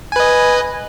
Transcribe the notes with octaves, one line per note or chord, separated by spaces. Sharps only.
B4 D#5 G#5